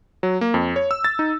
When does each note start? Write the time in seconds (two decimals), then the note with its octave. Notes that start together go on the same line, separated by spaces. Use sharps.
0.23 F#3
0.41 A#3
0.54 F2
0.76 C#5
0.91 E6
1.04 A6
1.19 D#4